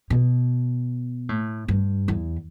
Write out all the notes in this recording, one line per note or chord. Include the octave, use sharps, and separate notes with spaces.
B2
A2
G2
E2